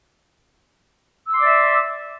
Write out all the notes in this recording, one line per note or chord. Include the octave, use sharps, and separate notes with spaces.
D5 E5 C6 D6 E6